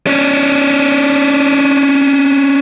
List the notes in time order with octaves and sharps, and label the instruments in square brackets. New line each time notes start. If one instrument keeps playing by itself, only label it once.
[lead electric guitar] C#4 D4